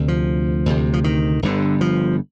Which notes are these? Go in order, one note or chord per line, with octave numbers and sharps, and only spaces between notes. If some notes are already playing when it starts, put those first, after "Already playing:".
Already playing: D2 C3
F3
D2 C3
F3
D#3
G1 G2 D3
F3